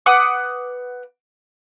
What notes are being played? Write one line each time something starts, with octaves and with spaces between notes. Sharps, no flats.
B4 F#5 D6 D#6